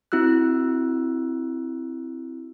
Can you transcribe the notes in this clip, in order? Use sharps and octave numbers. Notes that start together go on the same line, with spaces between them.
C4 E4 F#4 E6 F#6